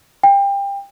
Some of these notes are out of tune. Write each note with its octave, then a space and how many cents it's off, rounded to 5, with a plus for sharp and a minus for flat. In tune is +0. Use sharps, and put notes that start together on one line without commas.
G5 +25